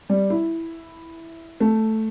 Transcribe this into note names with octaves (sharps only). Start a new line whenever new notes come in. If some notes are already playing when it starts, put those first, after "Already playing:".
G3
E4
A3